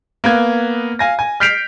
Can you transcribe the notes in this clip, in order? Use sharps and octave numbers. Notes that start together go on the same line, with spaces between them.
A#3 B3 G#6
F5 G#5 A#6
G#5
F6 G6 B6 C7 D7 F7